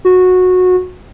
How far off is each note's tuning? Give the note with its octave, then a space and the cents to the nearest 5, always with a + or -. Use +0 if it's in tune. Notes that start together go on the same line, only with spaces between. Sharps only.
F#4 -15